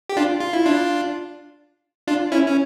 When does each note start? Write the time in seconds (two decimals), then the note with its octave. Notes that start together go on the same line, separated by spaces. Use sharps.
0.09 G4
0.17 D4 F4
0.40 F4
0.53 E4
0.66 D4 F4
2.07 D4 F4
2.32 C#4 E4
2.46 C#4